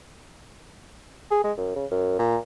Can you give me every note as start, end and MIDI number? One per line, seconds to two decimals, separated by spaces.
1.31 1.42 68
1.44 1.52 56
1.57 1.73 42
1.76 1.85 49
1.91 2.17 42
2.19 2.37 46